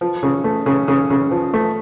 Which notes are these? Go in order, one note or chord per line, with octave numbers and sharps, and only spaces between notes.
F3
C#3
A3
C#3
C#3
C#3
F3
A3